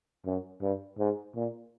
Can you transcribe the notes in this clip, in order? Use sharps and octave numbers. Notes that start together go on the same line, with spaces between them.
F#2
G2
G#2
A#2